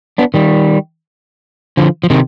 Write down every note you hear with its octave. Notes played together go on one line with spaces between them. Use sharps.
B3 D4
D#3 G3
D3 F3
F3
C3 D#3